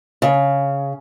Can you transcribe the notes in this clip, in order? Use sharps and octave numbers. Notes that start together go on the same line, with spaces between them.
C#3